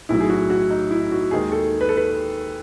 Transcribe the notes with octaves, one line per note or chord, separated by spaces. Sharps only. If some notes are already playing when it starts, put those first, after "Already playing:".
B1 A2 F#3 E4
G#4
F#4
F#4
D#4
E4
F#4
D#2 D#3 G#3 G#4
A4
B4
A4
B4